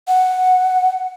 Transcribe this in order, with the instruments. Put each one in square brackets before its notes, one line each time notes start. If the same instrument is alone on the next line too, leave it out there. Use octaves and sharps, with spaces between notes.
[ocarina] F#5